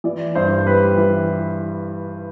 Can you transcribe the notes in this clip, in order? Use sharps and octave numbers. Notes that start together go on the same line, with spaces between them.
E3 D5
G2 C5
G3 B4
E3